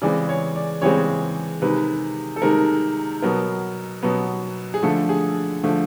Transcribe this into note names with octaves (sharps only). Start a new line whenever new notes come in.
C#3 E3 G#3 C4 D5
C#5
D5
C#3 E3 G#3 C4 C#5
C3 D#3 G#3 B4
A4
C3 D#3 G#3 A#4
B2 F#3 B3 A#4
B2 F#3 B3
G#4
D3 F3 A3 A4
G#4
D3 F3 A3